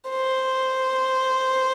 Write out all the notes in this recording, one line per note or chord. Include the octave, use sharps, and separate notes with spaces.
C5